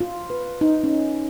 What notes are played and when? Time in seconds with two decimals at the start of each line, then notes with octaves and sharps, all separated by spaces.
0.01 F4
0.30 B4
0.61 D#4
0.84 C#4